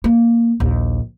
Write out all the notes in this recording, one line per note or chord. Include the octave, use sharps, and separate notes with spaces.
A#3
A#1 D#2